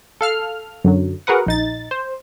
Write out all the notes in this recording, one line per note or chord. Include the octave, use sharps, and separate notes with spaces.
A4 F5 F6
F#2 D3 F#3
F#4 G#4 A#4 B4 F#5
A#1 D#4 A6
C5